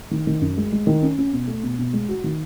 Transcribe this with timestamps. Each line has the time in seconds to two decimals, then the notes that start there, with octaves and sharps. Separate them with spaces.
0.11 D#3
0.27 D#3
0.41 F#2
0.57 G#3
0.72 G#3
0.87 D#3
1.02 C#4
1.18 C#4
1.33 B2
1.48 A3
1.63 B2
1.79 B2
1.93 G#3
2.09 F#4
2.24 D#3